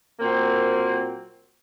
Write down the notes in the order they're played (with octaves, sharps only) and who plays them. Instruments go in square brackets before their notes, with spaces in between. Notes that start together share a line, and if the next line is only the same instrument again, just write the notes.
[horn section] A#2 F#3 A#3 C4